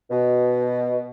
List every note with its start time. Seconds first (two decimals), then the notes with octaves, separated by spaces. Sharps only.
0.11 B2